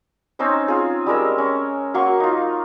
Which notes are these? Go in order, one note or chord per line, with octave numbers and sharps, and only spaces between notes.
C4 C#4 D#4 C5
F4 G#4
G3 G#3 A#4 E6
C#4
F#3 A#3 C6 C#6
D#4 F4